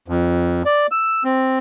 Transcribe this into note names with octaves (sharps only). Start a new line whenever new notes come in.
F2
D5
E6
C4